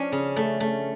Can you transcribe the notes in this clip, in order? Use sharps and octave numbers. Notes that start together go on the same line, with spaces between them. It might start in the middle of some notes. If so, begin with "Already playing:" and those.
Already playing: F3 C#4 D4
C#3
A3
A3